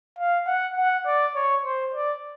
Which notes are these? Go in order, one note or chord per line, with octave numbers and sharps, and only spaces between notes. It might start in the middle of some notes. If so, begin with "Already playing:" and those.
F5
F#5
F#5
D5
C#5
C5
D5